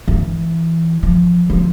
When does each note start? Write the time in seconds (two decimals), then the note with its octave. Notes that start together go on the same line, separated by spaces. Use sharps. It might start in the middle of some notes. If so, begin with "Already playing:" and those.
0.08 E3
1.03 F3
1.50 F3